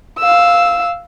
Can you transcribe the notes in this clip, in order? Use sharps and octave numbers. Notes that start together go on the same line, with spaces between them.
F5 E6